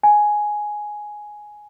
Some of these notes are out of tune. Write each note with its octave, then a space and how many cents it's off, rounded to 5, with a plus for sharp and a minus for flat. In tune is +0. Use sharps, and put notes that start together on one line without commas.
G#5 +5